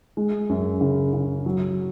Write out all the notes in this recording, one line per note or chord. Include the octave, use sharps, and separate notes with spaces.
G#3
F#2
C#3
C#3
F#3